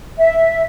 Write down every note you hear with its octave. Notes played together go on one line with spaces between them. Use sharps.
E5